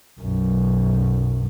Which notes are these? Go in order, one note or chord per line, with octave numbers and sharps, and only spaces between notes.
B1 F#2